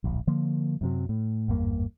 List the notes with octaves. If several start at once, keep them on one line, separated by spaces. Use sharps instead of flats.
D1 A#1
D3 F3 A#3
F#2 C3 F#3
A2
G#1 E2 G2 A#3